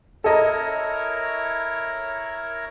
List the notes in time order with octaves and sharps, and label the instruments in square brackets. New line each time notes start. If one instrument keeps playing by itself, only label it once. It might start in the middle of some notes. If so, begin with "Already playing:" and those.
[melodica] E4 A#4 C#5 [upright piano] A4 D#5 A#5